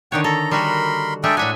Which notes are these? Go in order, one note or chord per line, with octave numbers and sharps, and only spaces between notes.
D3 D#3 C#5 F#5 G5
A4 A#5
G3 F#4 A#4 B5 C6
G#3 D4 A4 A#4 E5 G5
A2 D4 E5 F#5 G#5